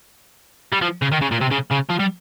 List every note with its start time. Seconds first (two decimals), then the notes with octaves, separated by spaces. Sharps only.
0.73 G3
0.82 F3
1.02 C#3
1.12 D#3
1.21 C#3
1.31 A#2
1.41 C3
1.50 C#3
1.71 C#3
1.89 F3
1.99 G3